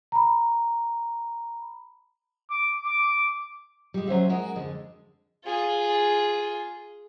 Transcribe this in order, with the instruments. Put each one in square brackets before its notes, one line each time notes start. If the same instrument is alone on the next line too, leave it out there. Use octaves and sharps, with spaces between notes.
[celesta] A#5 B5
[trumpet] D6
D6
[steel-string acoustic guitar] G3 G#3
F#3 C#4 C5 E5
G#3 F#4 A#4 D#5
F2 D3 G#3
[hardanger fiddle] F4 G#4